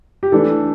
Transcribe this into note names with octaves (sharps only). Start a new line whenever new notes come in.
G4
E3 A3 D4 A4